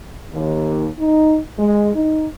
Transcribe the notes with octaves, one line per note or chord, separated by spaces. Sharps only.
D#2
D#4
G#3
D#4